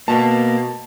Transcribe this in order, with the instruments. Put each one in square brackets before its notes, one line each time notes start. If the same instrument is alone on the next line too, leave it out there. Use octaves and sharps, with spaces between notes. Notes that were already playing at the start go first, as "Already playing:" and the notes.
[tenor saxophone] B2 [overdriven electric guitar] A#3 [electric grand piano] A5